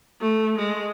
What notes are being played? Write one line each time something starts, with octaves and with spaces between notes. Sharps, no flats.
A3
G#3